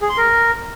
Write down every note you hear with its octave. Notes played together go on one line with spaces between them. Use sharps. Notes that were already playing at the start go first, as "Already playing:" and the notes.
G#4
C6
A#4